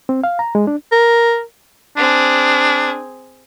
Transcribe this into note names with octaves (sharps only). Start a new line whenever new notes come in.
C4
F5
A#5
G#3
D4
A#4
C4 D4 G#4